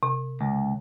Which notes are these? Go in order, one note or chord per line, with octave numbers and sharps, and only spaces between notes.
C3
C#2